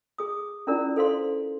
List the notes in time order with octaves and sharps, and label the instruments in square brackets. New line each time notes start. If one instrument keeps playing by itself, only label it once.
[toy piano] G#4 D#6
C#4 D4 E4 F4 A#4 D5
A4 C5 F5 C6